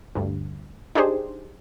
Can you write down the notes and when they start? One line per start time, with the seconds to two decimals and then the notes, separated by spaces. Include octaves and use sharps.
0.15 D2 G2
0.95 D4 D#4 G4 G#4 C5